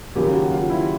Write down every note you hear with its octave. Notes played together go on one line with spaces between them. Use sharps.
D#2 C#3 F#3 G4
F#4
F4
E4